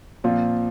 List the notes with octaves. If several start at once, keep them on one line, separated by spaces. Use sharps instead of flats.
A#2 F3 C4 F4